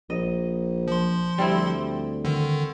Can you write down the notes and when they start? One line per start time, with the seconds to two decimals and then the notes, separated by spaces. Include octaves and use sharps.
0.10 A#1 D#5
0.88 F3 C6
1.38 D2 G3 C4 E4
2.25 D3 D#3